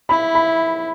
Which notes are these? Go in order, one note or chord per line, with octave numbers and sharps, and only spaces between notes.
E4 B5
B5